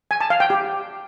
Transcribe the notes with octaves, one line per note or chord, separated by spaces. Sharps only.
G#5
A5
F5
G5
G4